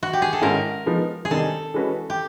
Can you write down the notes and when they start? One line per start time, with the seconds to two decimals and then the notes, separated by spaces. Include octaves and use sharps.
0.03 F#4
0.13 G4
0.22 G#4
0.33 A4
0.41 G#2 D#3 G#3 C#4 E4 A#4
0.86 F3 G#3 B3 D#4
1.25 G#4
1.31 C3 D#3 G3 C4 A4
1.74 E3 G#3 C#4 F#4 B4
2.10 G4